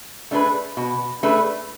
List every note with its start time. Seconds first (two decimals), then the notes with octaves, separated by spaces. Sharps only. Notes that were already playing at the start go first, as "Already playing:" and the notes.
0.31 A3 D4 G#4 B4
0.77 B2
1.23 A3 D4 G#4 B4